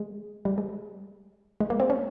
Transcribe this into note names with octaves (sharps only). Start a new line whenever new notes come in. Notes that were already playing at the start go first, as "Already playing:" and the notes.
Already playing: G#3
G3
G#3
G#3
A#3
C4
C#4